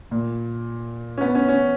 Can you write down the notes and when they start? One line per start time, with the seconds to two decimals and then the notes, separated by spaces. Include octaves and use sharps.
0.11 A#2
1.18 C#4
1.21 B3
1.35 C#4
1.49 C#4